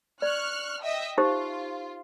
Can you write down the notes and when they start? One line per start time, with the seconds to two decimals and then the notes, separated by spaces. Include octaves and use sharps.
0.22 D5 C#6 F6 F#6
0.83 D#5 E5 G5
1.18 D#4 F4 G4 C5